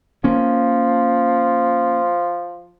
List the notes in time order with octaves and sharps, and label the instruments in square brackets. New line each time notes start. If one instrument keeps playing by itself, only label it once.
[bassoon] F3 [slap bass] A#3 C#4